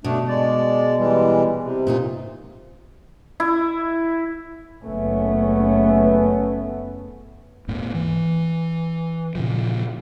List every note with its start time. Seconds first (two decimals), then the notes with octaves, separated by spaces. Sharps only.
0.04 B2 A3 D4
0.28 G#3 D5
0.98 E3 G3 G#3
1.63 C3
1.87 A#2 D#4 F4
3.40 E4
4.83 F#1 A3 B3 C#4
7.68 D#1 G#2 A#3
7.95 E3
9.35 A#2 C#3 F3